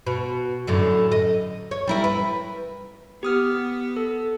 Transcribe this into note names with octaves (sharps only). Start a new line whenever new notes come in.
B2
F#2 A2 D3
D#5
C#5
G3 E4 A#4
B4
B3 G4 D#6 F6
A4